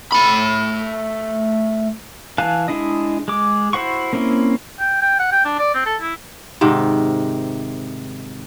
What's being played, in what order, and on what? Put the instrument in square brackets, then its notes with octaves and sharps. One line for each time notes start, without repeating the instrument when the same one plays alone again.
[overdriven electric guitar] A3 B5
[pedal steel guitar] E3 F5 G#5 A5 F#6
G#3 D4 E4 D#5
G#3 D6
E4 F#4 C5 F#5 C#6
A#3 C4 C#4 E4
[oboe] G5
G5
F#5
G5
D4
D5
C4
A4
E4
[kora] G#2 C3 D#3